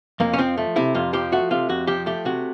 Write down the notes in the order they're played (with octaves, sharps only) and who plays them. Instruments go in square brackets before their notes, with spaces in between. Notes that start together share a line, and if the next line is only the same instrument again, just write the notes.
[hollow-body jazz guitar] F2 A#3
C#4
F3 C4
A3
C3 E4
F2 F4
F3 G4
A3 F#4
C3 F4
F2 F#4
F3 G4
A3 G4
C3 F#4